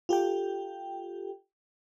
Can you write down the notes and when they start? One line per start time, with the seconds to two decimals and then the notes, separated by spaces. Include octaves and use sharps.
0.09 F4 G4 A4 G5